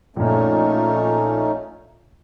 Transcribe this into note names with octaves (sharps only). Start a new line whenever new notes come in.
A#1 A#2 A3 C#4 D#4